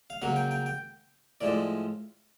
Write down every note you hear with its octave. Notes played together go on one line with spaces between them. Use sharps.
F5
C#3 F#3 A#3 F#5
G5
G5
G5
A2 F3 G#3 D5